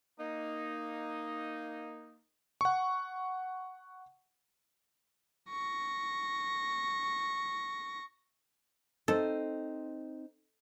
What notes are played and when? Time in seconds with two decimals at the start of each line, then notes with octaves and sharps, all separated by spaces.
0.18 A#3 D#4
2.61 F#5 C#6
5.50 C#6 A#6
9.08 C4 D#4 A4 C5